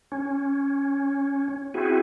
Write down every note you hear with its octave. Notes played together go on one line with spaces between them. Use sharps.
C#4
C4 E4 F#4 G#4